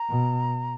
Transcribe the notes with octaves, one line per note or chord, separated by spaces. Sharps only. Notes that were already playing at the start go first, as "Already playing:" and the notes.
Already playing: A#5
B2